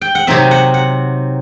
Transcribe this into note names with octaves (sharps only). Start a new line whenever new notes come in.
G5
F#5
C3 F#3 C4 D#4 E5
F#5
F#5